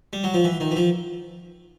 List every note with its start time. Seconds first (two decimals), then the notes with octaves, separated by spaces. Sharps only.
0.13 G3
0.24 F#3
0.34 F3
0.44 E3
0.60 D#3
0.71 E3
0.76 F3